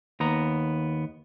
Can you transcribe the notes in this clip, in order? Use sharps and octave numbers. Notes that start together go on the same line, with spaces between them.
D#2 B3 A#5